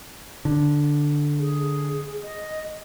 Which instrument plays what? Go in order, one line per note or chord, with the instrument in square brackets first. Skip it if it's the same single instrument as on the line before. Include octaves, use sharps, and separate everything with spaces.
[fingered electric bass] D3
[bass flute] G#4
D#5